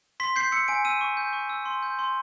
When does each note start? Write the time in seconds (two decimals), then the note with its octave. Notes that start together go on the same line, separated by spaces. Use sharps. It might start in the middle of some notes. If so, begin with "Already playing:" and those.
0.20 C6 B6
0.36 G6 C7
0.52 E6 C#7
0.68 G#5 D7
0.85 E6 D#7
1.01 C#6
1.17 G6
1.33 C#6
1.50 E6
1.66 C6
1.83 G6
1.99 C6